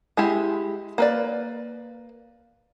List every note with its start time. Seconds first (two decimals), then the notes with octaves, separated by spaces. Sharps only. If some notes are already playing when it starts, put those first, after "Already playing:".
0.17 G#3 E4 G4
0.98 A#3 B4 D5